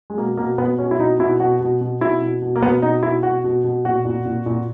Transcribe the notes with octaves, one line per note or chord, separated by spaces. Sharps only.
G#3
B2 A#3
B2 A#3
B2 B3
B2 C#4
E4
B2 D#4
B2 E4
B2 F#4
B2
B2
B2 E4
B2
B2
A#3
B2 B3
B2 D#4
B2 E4
B2 F#4
B2
B2
A#2 F#4
A#2
A#2
A#2